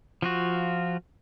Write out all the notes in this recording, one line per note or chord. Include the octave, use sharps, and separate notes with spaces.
F3 F4 F#4